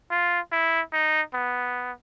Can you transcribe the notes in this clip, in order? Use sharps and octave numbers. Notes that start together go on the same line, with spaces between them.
F4
E4
D#4
B3